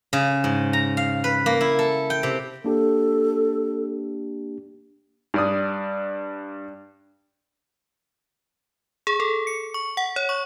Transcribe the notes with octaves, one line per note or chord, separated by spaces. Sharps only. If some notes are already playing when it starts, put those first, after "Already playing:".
C#3
G#2
A#5
F5
B4
A#3
E4
A4
G5
C3
A#3 D4 G4 A4
G2 D5 D#6
G#4
A4
C#7
C#6
F#5
C#5
C#6